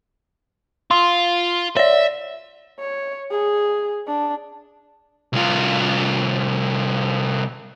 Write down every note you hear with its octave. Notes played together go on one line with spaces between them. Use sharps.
F4 C6
C#5 D5 E5
C#5
G#4
D4
C2 F4